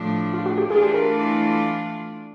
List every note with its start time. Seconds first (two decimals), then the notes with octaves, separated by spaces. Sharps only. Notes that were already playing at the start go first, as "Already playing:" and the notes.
Already playing: A2 F3 A3 D4
0.34 F4
0.46 F#4
0.58 G4
0.69 E3 A3 D4 F4 G#4
0.83 G4
0.94 A#4